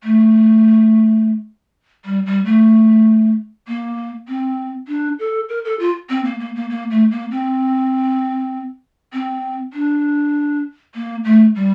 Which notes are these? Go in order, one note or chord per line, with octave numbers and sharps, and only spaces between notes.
A3
G3
G3
A3
A#3
C4
D4
A4
A#4
A4
F4
C4
A#3
A#3
A#3
A#3
A3
A#3
C4
C4
D4
A#3
A3
G3